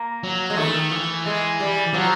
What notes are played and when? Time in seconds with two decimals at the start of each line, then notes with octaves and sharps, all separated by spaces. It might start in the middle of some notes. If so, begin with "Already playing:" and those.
Already playing: A#3
0.23 F#3
0.50 G#3
0.57 D#3 A3
0.65 E3
0.74 D#3
0.91 E3
1.26 G#3
1.60 G3
1.94 F3 F#3